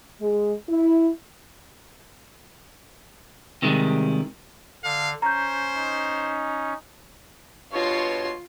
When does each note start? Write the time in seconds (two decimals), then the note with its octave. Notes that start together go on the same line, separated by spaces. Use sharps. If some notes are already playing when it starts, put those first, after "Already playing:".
0.20 G#3
0.69 E4
3.62 C3 D#3 G3 G#3
4.84 D3 F5
5.22 C#4 C5 A#5 G6
5.77 D#4
7.73 G2 B2 F4 C#5 C6